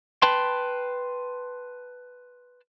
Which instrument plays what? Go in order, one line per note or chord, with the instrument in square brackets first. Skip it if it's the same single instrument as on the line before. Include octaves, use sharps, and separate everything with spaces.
[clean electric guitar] B4 G5 A5 B5 C6